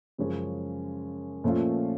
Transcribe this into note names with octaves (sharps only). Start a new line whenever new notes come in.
F#2 C#3 F3 G#3 C#4
A#2 F3 A3 C#4 F4